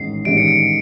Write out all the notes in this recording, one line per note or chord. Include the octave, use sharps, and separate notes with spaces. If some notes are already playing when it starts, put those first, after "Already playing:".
Already playing: A1 G#2 D#3 C7
A1 G#2 D#3 G3 D7
C#7
D7